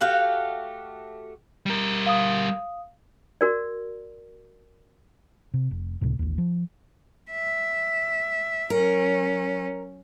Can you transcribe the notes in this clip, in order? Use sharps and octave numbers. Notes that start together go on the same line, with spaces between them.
A3 F#4 G4 F5
G3 A#4
F5 D#6
F#4 A#4 D5
C3
F1
C#2 A2 C3
A1 D#2
F3
E5
F#3 C#4 A#4